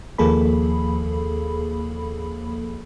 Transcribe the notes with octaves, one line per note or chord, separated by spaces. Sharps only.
D#2 F3 A#3 G#4 A4 B5